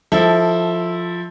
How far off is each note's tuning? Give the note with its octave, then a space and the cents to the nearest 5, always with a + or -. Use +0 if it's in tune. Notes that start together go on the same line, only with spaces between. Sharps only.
F3 +0 E4 -20 A4 +0